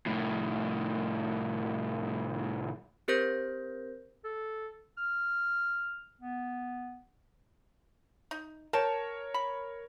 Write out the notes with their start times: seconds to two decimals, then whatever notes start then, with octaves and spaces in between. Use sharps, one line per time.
0.06 C2 A2
3.08 C4 G4 A#4 C5 G6 A#6
4.24 A4
4.97 F6
6.21 B3
8.31 D#4
8.73 A#4 C#5 G5 A5
9.34 B5